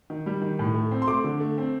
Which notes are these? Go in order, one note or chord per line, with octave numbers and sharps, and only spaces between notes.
D#3
G3
D#3
A2
A3
C4
C6
A3 D6
D3
A3
C4